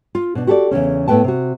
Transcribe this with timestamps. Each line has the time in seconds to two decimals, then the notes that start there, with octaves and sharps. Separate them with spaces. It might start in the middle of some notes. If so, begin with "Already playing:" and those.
0.15 F4
0.35 B2 D4
0.47 F#4 G4 A4 C5 D5
0.71 E2 G2 C#3 C#4
1.08 A2 A3 B3 B4 G5 A5
1.24 C3 F#4